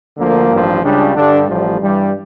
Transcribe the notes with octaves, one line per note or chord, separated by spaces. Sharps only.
D2 D3 F3 A#3
A1 G2 F3
C#2 C#3 G3 D4
G2 D3 G3 D4
A1 A2 F3 G3
G2 E3 G3